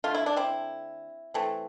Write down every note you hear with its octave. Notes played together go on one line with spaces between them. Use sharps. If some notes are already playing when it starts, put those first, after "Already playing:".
D3 A3 F4
E4
D4
C4 E4
E3 A3 C4